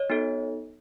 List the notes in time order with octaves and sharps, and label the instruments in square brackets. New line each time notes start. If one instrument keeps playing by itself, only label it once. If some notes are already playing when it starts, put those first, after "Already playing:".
Already playing: [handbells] C#5 D#5
B3 D#4 F#4 A4